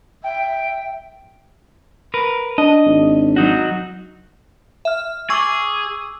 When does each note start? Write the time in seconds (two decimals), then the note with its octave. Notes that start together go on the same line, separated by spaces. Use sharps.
0.24 E5 G5
2.14 A#4 B4
2.58 D4 D#5
2.86 G#1
3.36 F#3 D#4 F#4
4.85 E5 F6
5.30 G#4 C#6 D6 E6